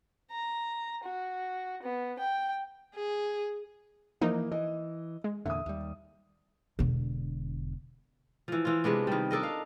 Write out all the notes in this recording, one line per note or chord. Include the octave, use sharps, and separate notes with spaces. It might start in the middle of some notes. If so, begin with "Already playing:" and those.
A#5
F#4
B3
G5
G#4
E3 F3 A#3 D#4
E3 D#5
G#3
E2 A#2 D3 E5 D#6
D#2 G3
E1 D3
E3 F3
E3 F4
C3 G#3 B3 D4
D#3 G3
D4 A4 A#4 D#5
F5